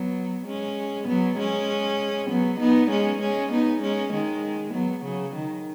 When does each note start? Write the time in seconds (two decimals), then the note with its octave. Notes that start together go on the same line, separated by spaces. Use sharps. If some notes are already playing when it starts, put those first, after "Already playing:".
Already playing: F#3 B3
0.46 G#3 C#4
1.08 F#3 B3
1.38 G#3 C#4
2.30 F#3 B3
2.60 B3 D#4
2.90 G#3 C#4
3.21 G#3 C#4
3.52 B3 D#4
3.82 G#3 C#4
4.12 D#3 G#3
4.74 F#3 B3
5.04 C#3 F#3
5.36 D#3